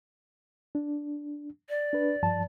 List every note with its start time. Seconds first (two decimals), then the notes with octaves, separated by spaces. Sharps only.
0.75 D4
1.69 D5
1.93 D4 B4
2.23 G2 F3 A5